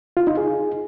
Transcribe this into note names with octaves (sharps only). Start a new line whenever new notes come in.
F4
D#4
G#4